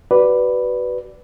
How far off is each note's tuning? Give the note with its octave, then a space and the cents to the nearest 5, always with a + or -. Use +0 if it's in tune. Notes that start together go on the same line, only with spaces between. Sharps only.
F#4 +30 B4 +0 D5 +0